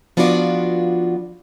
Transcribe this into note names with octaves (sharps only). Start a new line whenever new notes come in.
F3 B3 D4 F4 F#4 D5